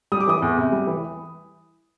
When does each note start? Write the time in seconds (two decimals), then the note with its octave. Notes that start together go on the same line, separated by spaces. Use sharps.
0.12 G3 D#6
0.20 D6
0.27 E3 D#6
0.42 E2
0.57 C3
0.72 G3
0.87 E3